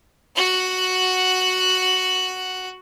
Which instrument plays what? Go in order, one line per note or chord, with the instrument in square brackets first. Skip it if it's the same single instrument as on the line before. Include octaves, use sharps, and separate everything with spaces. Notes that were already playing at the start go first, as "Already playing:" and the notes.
[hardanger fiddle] F#4 F#5